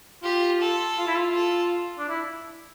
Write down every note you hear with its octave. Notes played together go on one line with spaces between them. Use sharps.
F4 G4
A4
F4
E4
F4
A4
D4
E4